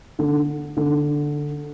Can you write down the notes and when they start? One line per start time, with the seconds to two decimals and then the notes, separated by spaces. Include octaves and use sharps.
0.19 D3
0.77 D3